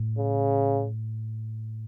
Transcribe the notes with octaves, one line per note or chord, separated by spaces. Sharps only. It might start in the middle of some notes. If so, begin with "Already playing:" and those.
Already playing: A2
C#3